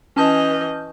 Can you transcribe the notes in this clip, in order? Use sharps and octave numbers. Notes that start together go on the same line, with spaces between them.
E3 C#4 D#5 A5 G6